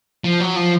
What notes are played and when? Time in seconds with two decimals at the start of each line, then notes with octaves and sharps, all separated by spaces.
0.24 F3
0.40 F#3
0.56 F3